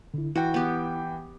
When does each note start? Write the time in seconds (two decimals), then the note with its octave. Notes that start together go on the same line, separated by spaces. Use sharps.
0.14 D3 E4
0.36 E3 E4 F#4 G5
0.54 B3 G4